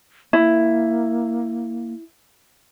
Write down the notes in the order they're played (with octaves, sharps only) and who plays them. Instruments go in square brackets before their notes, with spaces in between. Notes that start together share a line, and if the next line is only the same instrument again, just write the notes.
[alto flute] A#3 [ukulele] E4